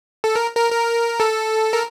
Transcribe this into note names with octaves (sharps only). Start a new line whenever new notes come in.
A4
A#4
A#4
A#4
A4
A#4